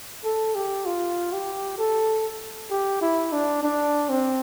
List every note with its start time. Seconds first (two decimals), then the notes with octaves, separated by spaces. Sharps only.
0.24 A4
0.55 G4
0.86 F4
1.32 G4
1.78 A4
2.71 G4
3.01 E4
3.32 D4
3.63 D4
4.09 C4